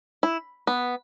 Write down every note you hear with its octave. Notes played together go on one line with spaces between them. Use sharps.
E4
B3